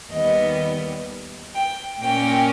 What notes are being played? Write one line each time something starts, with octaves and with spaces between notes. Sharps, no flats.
D#2 D#3 G3 B3 D#5
G5
A#2 A#3 C#4 G5